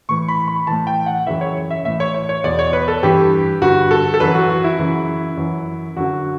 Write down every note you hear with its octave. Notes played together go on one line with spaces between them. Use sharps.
A2 E3 C#6
B5
B5
A2 E3 A5
G5
F#5
F#2 C#3 E3 E5
C#5
E5
A2 E3 E5
C#5
C#5
C#5
E2 B2 D5
C#5
B4
A4
G2 E3 G4
G2 D3 F#4
A4
A4
F#2 E3 B4
F#4
F#4
E4
F#2 C#3 E3
F#2 E3
F#2 D3 F#4